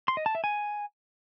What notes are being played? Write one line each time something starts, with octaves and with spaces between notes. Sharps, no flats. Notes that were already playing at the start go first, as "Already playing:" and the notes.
C6
D#5
A5
E5
G#5